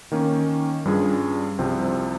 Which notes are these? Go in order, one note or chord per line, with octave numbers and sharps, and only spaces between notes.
D#3 A#3 C#4
G2 G3 C#4 F4 G#4
C2 C3 F3 C4